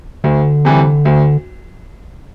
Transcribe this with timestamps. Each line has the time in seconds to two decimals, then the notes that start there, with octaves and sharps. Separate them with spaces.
0.24 D2 D3
0.65 C3 E3 G3
1.05 D2